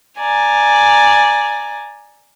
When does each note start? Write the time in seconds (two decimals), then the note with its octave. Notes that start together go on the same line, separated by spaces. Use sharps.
0.20 D5 G#5 A#5